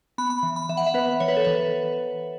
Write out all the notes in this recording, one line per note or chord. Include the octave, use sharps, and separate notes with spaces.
B3 B5
B5
E3
B5
E3 E5
F#5
E5
B3 B4
E3 C#5
B4
A4
E3 B4